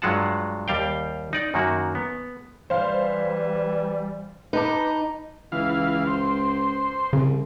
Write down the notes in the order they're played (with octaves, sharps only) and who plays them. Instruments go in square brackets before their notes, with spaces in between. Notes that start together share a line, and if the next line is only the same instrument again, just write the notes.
[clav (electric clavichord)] G2 F#3 G#3 F4 F#5 A5
D#2 G3 F5 G5
D#4 D5
F#2 D#3 A#3 F#4
B3
[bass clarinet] E3 [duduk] G3 [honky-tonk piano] C5 F5
[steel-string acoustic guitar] D#4 [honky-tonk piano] B4 A5 D6
[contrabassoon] C#2 [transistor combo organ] E3 F5
[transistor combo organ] C5
[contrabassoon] C2 [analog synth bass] C#3